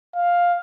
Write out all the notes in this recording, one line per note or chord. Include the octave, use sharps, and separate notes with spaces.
F5